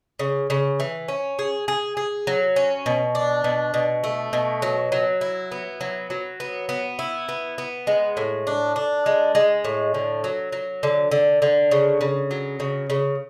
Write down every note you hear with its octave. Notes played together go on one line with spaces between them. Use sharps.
C#3
C#3
E3
C#4
G#4
G#4
G#4
F#3
C#4
B2
D4
B2
B2
A3
B2
F#3
F#3
E4
B3
F#3
F#3
B3
B3
E4
B3
B3
G#3
A2
D4
D4
G#3
G#3
A2
D3
F#3
F#3
D3
D3
D3
C#3
C#3
F#3
C#3
C#3